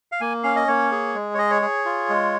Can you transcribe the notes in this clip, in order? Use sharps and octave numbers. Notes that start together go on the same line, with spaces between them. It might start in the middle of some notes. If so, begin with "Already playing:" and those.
F5
A#3 G#5
C#4 F5
D#5
A#3 C#5
G#4
G#3
C#5
G#4 D#5
C#5
G#4
F4
G#3